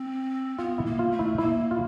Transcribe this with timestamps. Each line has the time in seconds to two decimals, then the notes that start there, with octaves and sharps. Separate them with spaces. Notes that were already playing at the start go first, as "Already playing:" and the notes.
Already playing: C4
0.58 B3 F4
0.78 E4
0.86 A#3
0.99 F4
1.11 A3
1.19 E4
1.38 A#3 E4
1.71 F4